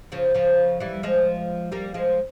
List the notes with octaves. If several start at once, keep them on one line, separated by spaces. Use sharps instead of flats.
C#3 F3
C#3 F3
E3 G3
F3 G#3
G3 A#3
F3 G#3